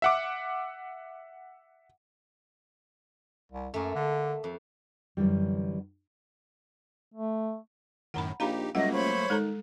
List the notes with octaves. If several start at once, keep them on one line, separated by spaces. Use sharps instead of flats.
E5 F#5 D6
C2
F#2 A3 A#3
D3
F2
F#2 D3 E3 G3
A3
F#2 A2 D#3 F#5 A#5 B5
A#1 D#4 G4 F5 A#5 B5
C#2 F#3 G3 A3 A#3 D#5 F#5
C5 C#5 B5
D#3 G#3 A4 A#5